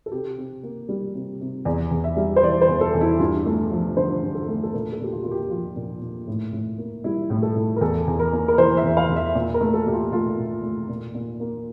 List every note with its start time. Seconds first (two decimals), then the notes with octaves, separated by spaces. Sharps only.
0.06 A4
0.12 C3 G4
0.38 C3
0.63 A#3
0.89 G3
1.15 C3
1.41 C3
1.65 E2 D5
1.91 E2
2.04 E5
2.17 G3
2.36 C5
2.43 E3 D5
2.61 C5
2.69 E2
2.81 A4
2.94 E2
3.01 E4
3.19 G2 F4
3.46 A3
3.71 F3
3.96 D3 C5
4.22 G2
4.35 A4
4.48 A3
4.63 A4
4.73 A#2 A#4
4.93 A4
5.00 A#2 G4
5.12 F4
5.23 A#3 F4
5.31 G4
5.50 F3 F4
5.76 A#2
6.02 A#2
6.28 A2
6.53 A2
6.78 A#3
7.04 G3 E4
7.30 A2
7.43 A4
7.56 A2
7.76 A#4
7.81 E2 A4
8.08 E2
8.20 A#4
8.33 A#3
8.48 A#4
8.58 E3 C5
8.77 E5
8.84 E2
8.97 F5
9.09 E2
9.16 E5
9.35 A#2
9.54 A#4
9.61 A3
9.73 A4
9.87 A#2 G4
9.94 F4
10.12 A3 F4
10.38 A#2
10.63 A3
10.89 A#2
11.14 A#2
11.40 A#3